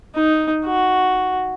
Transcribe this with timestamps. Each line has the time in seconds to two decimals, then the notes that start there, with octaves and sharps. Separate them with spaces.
0.15 D#4
0.65 F#4